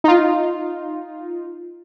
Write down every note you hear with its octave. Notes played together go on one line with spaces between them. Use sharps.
D#4 F4